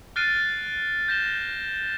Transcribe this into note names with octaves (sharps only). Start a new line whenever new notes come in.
F6 F#6 A6 C7 D7 D#7
G6 A#6 E7 G7